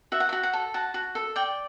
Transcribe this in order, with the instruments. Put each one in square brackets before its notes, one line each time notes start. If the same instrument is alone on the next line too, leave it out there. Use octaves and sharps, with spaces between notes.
[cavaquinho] F#4 E5
F#5
E5
F#4
F#5
A4
F#4 A5
F#4
A4
D5 G5